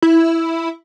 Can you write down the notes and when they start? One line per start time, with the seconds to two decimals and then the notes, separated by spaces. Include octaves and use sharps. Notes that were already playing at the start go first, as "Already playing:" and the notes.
0.02 E4